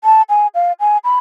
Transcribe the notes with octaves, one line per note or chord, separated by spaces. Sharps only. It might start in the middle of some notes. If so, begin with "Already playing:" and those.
A5
G#5
F5
G#5
B5